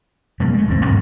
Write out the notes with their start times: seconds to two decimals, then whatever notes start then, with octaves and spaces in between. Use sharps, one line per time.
0.40 F2 B2 G3 A#3
0.53 G#3 A3
0.67 E1 D#2 G#2 C4
0.86 G2 B2 D#3 F#3